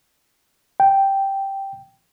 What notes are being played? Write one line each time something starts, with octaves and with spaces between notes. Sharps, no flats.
G5